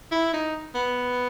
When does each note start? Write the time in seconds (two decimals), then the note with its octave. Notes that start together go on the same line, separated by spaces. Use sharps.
0.12 E4
0.33 D#4
0.75 B3